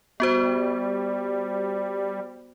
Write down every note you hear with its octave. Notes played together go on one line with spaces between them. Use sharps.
G3 B3 F#4 C5